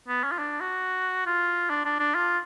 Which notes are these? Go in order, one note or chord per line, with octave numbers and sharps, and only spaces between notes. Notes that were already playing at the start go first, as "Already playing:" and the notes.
B3
C#4
F4
D4
F#4
F4
D4
D4
D4
F4